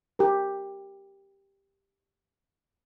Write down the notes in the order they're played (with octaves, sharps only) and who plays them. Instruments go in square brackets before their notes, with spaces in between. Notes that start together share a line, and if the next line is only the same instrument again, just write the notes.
[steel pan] G4 A#4